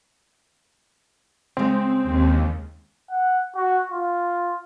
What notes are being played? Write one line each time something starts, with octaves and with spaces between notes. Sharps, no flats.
C#3 G#3 C4
D#2
F#5
F#4
F4